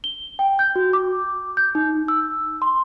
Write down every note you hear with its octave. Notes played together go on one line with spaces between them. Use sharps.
G7
G5
G6
F#4
D6
G6
D#4
E6
C6